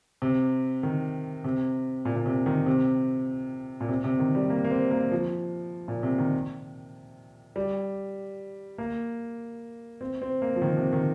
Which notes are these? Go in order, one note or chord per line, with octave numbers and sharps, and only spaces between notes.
C3
D#3
C3
A#2
A#2
C3
D#3
C3
A#2
C3
C3
D#3
G3
A#3
A#3
C4
A#3
F3
A#2
C3
D#3
G3
A#3
C4
C4
A#3
F3
D#3
C3
D#3